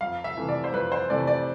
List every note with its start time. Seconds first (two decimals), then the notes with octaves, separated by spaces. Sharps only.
0.01 F2 F5
0.24 E5
0.37 C3 E3 A3
0.49 D5
0.64 C5
0.73 F2 B4
0.92 C5
1.10 C3 E3 A3 D5
1.27 D5